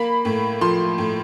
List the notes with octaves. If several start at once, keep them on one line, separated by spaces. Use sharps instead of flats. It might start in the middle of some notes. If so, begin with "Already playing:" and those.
Already playing: A#3 B5
A2
F3 C6
A2